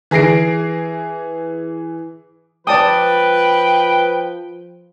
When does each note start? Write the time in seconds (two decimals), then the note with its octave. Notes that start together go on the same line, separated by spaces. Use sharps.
0.11 E3 G#4 A#6 C7 D7
2.67 F3 B4 D5 G5 A5 D#6